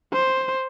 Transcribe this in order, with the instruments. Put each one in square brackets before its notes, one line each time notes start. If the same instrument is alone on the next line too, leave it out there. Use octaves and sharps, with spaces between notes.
[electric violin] C5